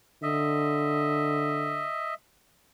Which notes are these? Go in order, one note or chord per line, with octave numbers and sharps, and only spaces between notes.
D3 D#5 E5